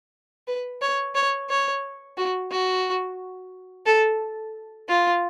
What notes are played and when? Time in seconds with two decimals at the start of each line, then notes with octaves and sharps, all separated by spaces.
0.48 B4
0.82 C#5
1.15 C#5
1.50 C#5
2.18 F#4
2.51 F#4
3.87 A4
4.89 F4